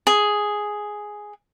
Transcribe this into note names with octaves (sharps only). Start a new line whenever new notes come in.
G#4